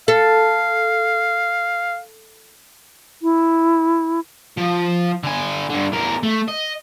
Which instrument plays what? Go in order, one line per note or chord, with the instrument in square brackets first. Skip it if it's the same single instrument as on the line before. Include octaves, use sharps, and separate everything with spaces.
[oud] A4 [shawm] F5
[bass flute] E4
[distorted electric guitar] F3
D3 G#5
G2 D3
E2 A#4
A3
D#5